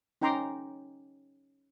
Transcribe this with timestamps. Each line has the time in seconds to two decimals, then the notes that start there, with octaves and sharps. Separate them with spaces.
0.21 C#4 D#4 G5 A#5 C6 D6